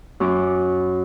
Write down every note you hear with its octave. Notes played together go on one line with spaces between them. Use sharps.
F#2 C#4 D6